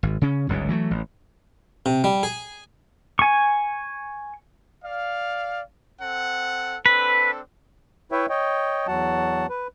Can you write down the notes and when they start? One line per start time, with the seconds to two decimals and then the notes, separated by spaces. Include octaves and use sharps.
0.03 G#1
0.22 C#3 C#4
0.49 G1 C#2 G#2 G3
0.69 E3 F#3 G3 A3
0.91 A1
1.86 C3
2.04 G3
2.23 G#4
3.19 G#5 C#6
4.84 D5 F5
6.02 C4 A4 F#5
6.86 C4 D4 A4 B4
8.12 E4 B4 C#5 E5 G5
8.30 C#5 D#5 G5
8.87 E2 F#3 F#4 F#5 A5
9.49 B4